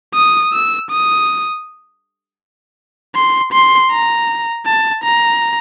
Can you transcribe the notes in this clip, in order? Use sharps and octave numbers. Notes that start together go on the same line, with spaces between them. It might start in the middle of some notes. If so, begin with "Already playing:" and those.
D#6
E6
D#6
C6
C6
A#5
A5
A#5